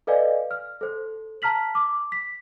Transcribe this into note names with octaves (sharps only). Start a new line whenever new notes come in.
A4 B4 D5 D#5 F5 G#5
F6
A4 C5
A5 A#5 F6 B6 F#7
D6
B6